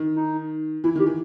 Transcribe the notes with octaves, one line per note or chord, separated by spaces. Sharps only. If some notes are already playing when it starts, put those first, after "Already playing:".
Already playing: D#3
D#4
E3 E4
D#3 G4
E3